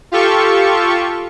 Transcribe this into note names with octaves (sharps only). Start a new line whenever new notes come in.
F4 G4 A4 C#6